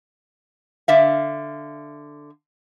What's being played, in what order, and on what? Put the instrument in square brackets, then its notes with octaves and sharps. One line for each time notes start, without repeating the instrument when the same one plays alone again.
[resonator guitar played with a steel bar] D3 E5 F5